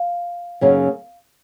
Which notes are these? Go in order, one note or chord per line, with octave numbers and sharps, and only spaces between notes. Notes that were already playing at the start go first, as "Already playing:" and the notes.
Already playing: F5
F#2 C#3 F#3 A#3 D#4